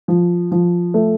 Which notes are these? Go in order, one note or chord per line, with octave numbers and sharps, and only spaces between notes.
F3
F3
A3